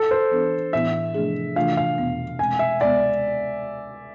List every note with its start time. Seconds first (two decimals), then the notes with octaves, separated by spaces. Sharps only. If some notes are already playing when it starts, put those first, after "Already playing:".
Already playing: A4
0.11 C5
0.31 E3 B3 D4 A4
0.73 A2 E3 B3 E4 E5
1.14 C3 F3 A3 D4 G#4
1.56 C3 E3 A3 D4 F4 F5
1.77 F5
1.98 E2 B2 B3
2.39 B2 G#3 C4 G#5
2.59 E5
2.80 D2 C3 G#3 B3 D5